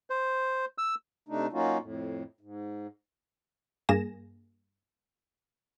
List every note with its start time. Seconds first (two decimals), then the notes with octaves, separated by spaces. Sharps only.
0.10 C5
0.78 E6
1.29 C3 A3 D4 D#4
1.53 F#3 A#3 C#4 D#4 F4 F#4
1.80 F2 A2
2.41 G#2
3.89 G2 A#3 G#4 G#5 A#6 E7